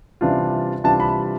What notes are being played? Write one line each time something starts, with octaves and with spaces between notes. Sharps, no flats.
C3 E3 G3 D4 F4
C3 E3 G3 D4 F4 A5
B5